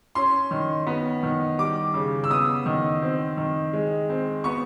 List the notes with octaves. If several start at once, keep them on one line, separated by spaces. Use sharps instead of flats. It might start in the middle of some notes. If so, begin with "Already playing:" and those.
C#4 C6
D#3
B3
D#3
G3 D6
C#3
E6
B3 D#6
D#3
C4
D#3
G#3
C4
B3 C#6